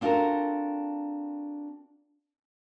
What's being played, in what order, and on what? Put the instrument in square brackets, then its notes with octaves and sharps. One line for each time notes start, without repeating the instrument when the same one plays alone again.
[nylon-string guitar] C4 D4 F4 F#4 A4 A#4